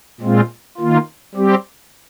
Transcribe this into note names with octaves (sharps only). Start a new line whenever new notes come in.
A#2 G#3 C4 F4
D#3 A#3 F4
G3 C4 G4